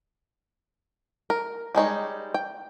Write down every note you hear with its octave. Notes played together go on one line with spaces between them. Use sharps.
A#4
G3 G#3 D#4 C#5
G5